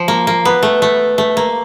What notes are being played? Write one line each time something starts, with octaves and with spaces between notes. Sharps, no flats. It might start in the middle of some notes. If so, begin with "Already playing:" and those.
Already playing: F3
A#3
A#3
B3
A3
A3
A3
A#3